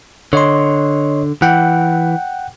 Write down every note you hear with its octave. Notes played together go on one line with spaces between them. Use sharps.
D3 C#5 D#5 C6
E3 F#5 G5